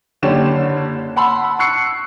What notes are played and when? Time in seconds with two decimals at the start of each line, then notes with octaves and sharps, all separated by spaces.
0.22 F#1 D3 C#4 G4 D5 E7
1.16 F#5 A5 B5 C6 E6
1.59 C#6 E6 F#6 C7 C#7